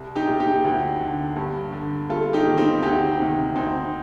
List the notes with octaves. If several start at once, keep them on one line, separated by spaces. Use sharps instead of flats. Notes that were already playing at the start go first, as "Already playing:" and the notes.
Already playing: C2
D#4 G4
A#2
D#4 G4
D2
D3
G2
D3
G2 F4 A4
D#4 G4
D#3
C4 D#4
D2 D#4 G4
C3 D#3
D2 C4 D#4